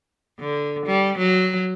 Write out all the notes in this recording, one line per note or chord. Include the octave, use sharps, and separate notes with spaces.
D3
G3
F#3